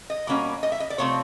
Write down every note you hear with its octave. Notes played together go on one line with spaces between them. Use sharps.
D#5
B2 G3 A#3 C#4
D#5
E5
D#5
D5
C3 F3 A3 C4 C#5